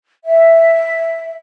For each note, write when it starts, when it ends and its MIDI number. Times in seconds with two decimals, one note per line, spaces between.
0.25 1.32 76